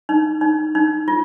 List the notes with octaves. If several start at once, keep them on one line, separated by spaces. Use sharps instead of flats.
D#4
D#4
D#4
F4